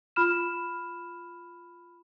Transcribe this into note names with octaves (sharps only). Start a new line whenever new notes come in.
F4 B5 F6 E7